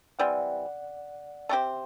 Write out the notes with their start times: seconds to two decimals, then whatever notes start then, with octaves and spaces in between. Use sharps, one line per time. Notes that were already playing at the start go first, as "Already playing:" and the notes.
0.19 E3 G3 C4 D5 F#5
1.49 A3 C4 G4 C5 E5 G5